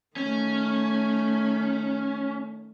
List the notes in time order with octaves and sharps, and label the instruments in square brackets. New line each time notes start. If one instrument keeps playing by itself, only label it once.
[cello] D#3 A3 [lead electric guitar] C#4